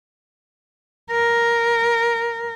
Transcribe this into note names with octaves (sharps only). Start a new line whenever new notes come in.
A#4